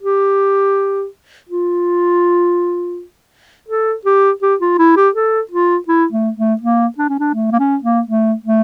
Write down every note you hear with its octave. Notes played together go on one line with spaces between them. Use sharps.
G4
F4
A4
G4
G4
F4
E4
G4
A4
F4
E4
A3
A3
A#3
D4
C#4
D4
A3
A#3
C#4
A#3
A3
A3